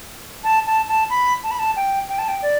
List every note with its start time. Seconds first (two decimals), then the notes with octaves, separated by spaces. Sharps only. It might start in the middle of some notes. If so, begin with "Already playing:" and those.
0.44 A5
0.66 A5
0.88 A5
1.10 B5
1.43 A5
1.51 B5
1.59 A5
1.76 G5
2.09 G5
2.19 A5
2.28 G5
2.42 D5